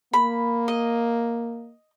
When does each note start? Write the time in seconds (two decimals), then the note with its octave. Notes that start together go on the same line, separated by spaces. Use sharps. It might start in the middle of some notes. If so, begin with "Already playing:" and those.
0.13 A#3 B5
0.68 D#5